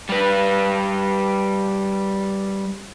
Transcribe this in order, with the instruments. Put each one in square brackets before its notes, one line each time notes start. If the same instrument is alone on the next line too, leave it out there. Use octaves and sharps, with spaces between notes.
[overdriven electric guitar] G3 B4